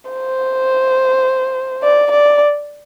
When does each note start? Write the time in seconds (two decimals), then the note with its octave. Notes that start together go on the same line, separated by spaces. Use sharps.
0.10 C5
1.83 D5
2.11 D5